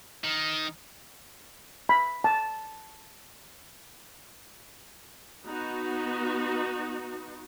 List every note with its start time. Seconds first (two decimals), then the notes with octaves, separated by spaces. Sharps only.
0.24 D#3
1.89 B5
2.24 A5
5.46 B3 D#4 F#4